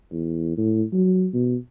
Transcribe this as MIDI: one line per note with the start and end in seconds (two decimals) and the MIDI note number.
0.12 0.55 40
0.57 0.83 45
0.92 1.27 54
1.34 1.56 47